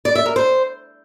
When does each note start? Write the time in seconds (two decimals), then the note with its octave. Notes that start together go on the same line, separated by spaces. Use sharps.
0.05 D5
0.15 E5
0.26 A#4
0.36 C5